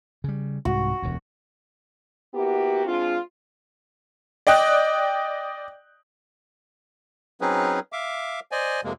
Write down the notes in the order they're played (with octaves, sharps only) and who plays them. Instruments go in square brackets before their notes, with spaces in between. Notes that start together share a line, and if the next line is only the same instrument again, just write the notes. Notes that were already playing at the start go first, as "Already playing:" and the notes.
[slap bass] C#3 G3
[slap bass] C2 G#2 [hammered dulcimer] F#4
[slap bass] E1 D2
[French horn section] A#3 B3 E4 F#4 G4
G#3 C4 D4 F4
[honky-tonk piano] D5 D#5 G5 F#6
[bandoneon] F#3 C4 C#4 D#4 G#4 B4
E5 F5 D6
C5 D5 D#5 G#5
F2 C3 G#3 A#3